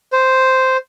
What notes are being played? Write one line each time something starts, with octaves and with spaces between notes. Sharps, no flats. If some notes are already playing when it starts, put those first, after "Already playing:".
C5